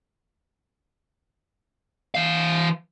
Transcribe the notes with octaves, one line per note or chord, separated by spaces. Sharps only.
E3 F5